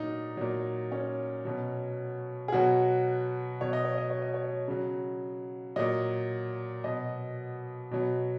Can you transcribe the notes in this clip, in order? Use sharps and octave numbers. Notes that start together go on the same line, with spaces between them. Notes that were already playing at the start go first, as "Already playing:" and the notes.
Already playing: A#2 F#3 D#4
A#2 F#3
C#4
B2 F#3
G#4
B2 F#3 F#4
B2 F#3 C#5
D#5
C#5
D#5
C#5
D#5
C#5
C#3 F#3
A#2 F#3 D#5
B2 F#3 D#5
B2 F#3